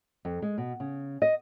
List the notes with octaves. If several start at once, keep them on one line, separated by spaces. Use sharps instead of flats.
F2
G#3
B2
C#3
D#5